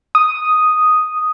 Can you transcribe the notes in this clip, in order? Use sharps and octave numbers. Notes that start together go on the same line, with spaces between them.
D#6